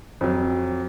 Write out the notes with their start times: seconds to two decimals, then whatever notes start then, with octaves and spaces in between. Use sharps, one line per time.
0.21 F2 F#3